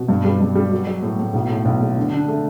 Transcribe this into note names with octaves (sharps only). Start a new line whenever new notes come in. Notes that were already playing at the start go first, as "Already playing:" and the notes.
Already playing: B2
G2
G3
G2
G3
F#3
F#3
A2
A2
B1
A2
B1
A2
D3
D4
A3